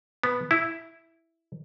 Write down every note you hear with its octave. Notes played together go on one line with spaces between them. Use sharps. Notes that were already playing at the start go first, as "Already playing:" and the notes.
B3
E4